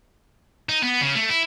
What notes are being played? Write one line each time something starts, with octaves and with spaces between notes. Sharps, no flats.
D#4
B3
C#3
A3
E4